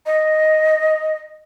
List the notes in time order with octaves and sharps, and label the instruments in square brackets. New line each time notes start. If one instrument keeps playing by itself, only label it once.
[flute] D#5